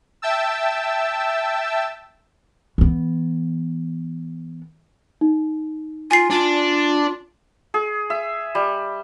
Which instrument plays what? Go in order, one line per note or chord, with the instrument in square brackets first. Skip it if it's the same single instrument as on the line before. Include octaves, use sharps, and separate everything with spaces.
[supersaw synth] E5 G5 A5 E6
[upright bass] E3 B3
[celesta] D#4
[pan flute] F4 [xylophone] G#5 C7
[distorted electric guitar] D4 [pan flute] F4
[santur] G#4
E5
G3